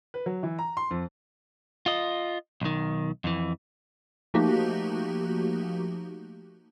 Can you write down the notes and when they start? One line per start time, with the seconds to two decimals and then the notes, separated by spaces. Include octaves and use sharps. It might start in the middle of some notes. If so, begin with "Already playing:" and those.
0.14 B4
0.26 F#3
0.43 E3
0.59 A#5
0.77 C6
0.91 F2
1.86 F4 D#5
2.62 B1 D#3
3.24 F2 E3
4.34 F3 A3 A#3 D#4 F#4 G4